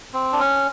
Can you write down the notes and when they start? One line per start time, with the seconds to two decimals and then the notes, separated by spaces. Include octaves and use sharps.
0.14 C4
0.33 D4
0.40 C#4